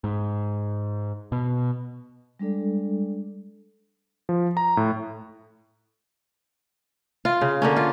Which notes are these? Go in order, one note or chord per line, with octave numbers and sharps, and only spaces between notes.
G#2
B2
G3 G#3 D4 A4 D5
F3
A#5
A2
F4
C#3
D3 A#3 C#4
F4